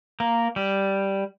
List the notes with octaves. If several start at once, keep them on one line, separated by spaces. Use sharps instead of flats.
A#3
G3